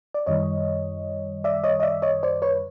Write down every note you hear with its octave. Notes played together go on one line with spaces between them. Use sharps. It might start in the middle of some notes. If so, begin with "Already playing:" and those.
D5
F#2 D#3 G3 C#5 D#5
D5 E5
C#5 D#5
D#5
D5 E5
C#5 D#5
C5 D5
B4 C#5